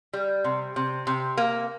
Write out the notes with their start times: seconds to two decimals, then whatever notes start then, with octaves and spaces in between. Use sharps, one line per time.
0.13 G3
0.44 C3
0.76 C3
1.07 C3
1.37 A#3